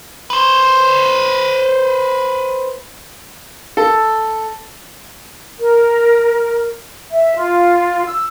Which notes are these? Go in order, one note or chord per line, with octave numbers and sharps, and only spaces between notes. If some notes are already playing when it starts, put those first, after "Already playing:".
B4 C5
A4
A#4
E5
F4
E6